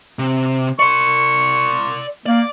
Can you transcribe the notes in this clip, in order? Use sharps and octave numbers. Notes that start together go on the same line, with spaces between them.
C3
D5 C6 C#6
A#3 D5